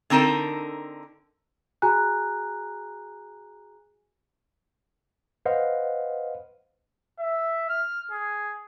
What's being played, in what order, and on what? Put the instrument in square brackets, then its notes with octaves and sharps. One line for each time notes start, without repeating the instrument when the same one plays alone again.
[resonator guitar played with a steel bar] D3 C4 D#4 A4 A#4
[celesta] F#4 G#4 G#5 A#5 F#6
[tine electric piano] B4 C5 D#5 F5 F#5
[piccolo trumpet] E5
F6
G#4